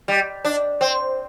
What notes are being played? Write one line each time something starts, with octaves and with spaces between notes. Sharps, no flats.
G3
D4
C4